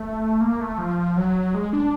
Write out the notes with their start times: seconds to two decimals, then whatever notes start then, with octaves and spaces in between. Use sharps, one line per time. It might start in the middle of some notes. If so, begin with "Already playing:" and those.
Already playing: A3
0.41 A#3
0.60 A3
0.78 F3
1.17 F#3
1.54 G#3
1.73 D4